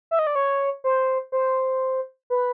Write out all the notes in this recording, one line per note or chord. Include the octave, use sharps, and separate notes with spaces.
E5
D#5
D5
C#5
C5
C5
B4